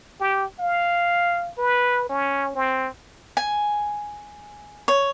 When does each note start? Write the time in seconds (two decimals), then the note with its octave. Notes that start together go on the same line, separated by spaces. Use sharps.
0.20 G4
0.60 F5
1.58 B4
2.09 C#4
2.55 C4
3.37 G#5
4.88 C#5